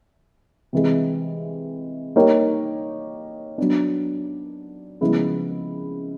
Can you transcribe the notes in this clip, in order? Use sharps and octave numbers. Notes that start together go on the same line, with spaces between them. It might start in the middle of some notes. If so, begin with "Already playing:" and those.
C3 E3 G#3
A#3 D#4 G4 A#4 C#5
F#3 B3 D4
C#3 F3 G#3 B3 E4